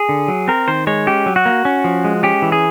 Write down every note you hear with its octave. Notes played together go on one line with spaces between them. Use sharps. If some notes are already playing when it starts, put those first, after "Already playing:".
Already playing: G#4
D3
F#3
C4 A#4
D#3 C5
G#3 C#5
C#4 G4
F#3
F#4
A#3
C#4
F3
G#3
C#4 G4
E3
G#4